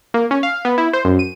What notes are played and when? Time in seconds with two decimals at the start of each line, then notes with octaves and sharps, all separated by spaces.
0.14 A#3
0.31 C#4
0.43 F5
0.65 B3
0.78 E4
0.93 C5
1.05 F#2
1.19 D#7